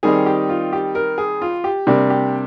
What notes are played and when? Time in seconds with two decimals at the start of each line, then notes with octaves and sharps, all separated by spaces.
0.03 D#3 G3 C4 D#4 G#4
0.26 G4
0.49 F4
0.73 G4
0.95 A#4
1.18 G#4
1.42 F4
1.64 G4
1.87 C3 G3 A#3 D4
2.10 G4